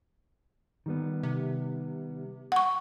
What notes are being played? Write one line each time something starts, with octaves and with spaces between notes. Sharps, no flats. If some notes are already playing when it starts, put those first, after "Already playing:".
D#3 G3 B3
C3
F#5 C#6